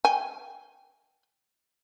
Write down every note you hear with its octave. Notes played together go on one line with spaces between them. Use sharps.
G5 G#5